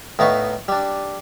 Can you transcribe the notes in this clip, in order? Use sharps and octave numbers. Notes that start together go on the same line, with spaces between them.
A2 B3 D#4 F5 C#6
G3 D4